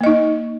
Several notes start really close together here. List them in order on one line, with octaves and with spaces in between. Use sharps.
A#3 D#5 D#4